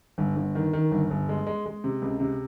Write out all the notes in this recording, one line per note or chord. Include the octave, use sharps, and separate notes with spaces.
G1
G1
D#3
D#3
G1
G1
G#3
G#3
G#3
C3
C#2
C3